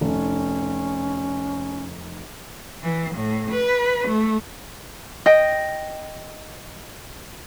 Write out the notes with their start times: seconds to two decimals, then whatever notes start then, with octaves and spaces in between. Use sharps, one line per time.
0.01 F1 C#4
2.83 E3
3.15 A2
3.51 B4
4.08 A3
5.26 D#5 G5